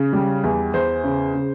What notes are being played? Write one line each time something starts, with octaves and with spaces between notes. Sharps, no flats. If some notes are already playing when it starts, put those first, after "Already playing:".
Already playing: C#3
G3
E2
E2 C5
C#3
C#3